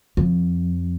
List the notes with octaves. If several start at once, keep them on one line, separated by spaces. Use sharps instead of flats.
F2